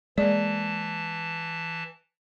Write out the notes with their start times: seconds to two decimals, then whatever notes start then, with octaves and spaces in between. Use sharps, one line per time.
0.18 E3 G#3 A#3 D5 A5